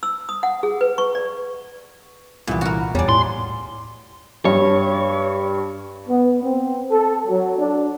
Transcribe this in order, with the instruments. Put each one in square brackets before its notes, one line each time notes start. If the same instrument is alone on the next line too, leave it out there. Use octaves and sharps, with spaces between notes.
[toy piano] E6
D#6
F#5
G#4
B4
C#6
D5
[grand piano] C2 E3 [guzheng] A#2 B3
[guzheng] F#4 A#4
[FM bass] E2 [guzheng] G3 D5 [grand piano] C#5 G#5
[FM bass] A2 [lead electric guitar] C6
[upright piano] G2 [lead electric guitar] C#5
[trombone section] B3
C4
A4
F#3
D4